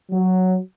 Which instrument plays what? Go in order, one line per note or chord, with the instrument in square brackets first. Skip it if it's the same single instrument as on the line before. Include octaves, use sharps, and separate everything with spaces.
[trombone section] F#3